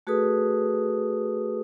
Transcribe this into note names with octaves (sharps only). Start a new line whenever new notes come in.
A3 F#4 G#4 A4 B4 D#6